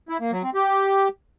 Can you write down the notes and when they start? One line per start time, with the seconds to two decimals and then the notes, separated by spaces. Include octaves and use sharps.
0.09 E4
0.20 A#3
0.32 F#3
0.43 C4
0.54 G4